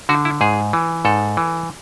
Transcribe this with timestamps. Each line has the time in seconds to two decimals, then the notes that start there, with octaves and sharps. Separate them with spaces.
0.09 D3 F#4
0.25 E4
0.41 G#2 G#4
0.73 E3
1.05 G#2 A4
1.37 E3